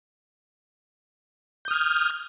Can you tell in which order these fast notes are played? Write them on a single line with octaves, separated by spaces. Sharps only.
G6 D#6 F6 G#6